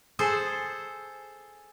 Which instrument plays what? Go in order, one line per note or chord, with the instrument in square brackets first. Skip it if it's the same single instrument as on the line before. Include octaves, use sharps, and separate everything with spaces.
[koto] G#4 A4 C5